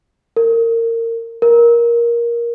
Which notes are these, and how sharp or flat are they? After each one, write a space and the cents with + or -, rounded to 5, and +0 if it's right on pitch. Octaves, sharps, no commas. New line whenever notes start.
A#4 -25
A#4 +15